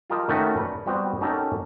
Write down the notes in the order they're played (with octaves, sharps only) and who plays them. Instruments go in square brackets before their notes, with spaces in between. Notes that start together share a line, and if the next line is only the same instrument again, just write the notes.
[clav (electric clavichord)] F4 G4 A#4 D#5 A5
D#3 A3 C#4 F#4 B4
B4 D5
G3 B3 C4 F#4
C#4 D#4 F#4 G4 A4 A#4